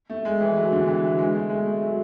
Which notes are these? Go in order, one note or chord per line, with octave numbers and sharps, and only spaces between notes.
A3
G#3
E3
F#3
D3
E3
F#3
G#3
A3
G#3
A3
F#3